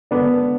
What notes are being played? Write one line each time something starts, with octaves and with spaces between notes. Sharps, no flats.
D3 B3 D4